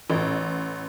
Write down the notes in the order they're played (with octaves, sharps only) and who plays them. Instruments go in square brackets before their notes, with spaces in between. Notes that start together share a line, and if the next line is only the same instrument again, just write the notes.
[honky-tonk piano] A1